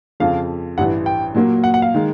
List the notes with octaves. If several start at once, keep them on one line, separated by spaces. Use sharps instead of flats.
F2 C#3 F3 F5
A1 G2 E3 F#5
G5
A#2 F#3 A#3
F#5
F#5
F5
D#3 G#3